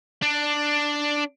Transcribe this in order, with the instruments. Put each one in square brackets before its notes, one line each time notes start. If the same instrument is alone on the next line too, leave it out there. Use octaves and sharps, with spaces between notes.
[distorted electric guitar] D4